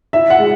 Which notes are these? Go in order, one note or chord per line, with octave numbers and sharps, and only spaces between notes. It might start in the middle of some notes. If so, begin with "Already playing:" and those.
E4 E5
F#5
G#3